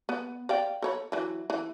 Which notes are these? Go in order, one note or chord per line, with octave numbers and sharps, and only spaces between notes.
B3
D5 F5 G5
A4 C#5 B5
E3 F#3
E3